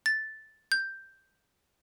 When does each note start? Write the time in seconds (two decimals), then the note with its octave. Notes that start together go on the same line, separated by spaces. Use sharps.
0.06 A6
0.72 G6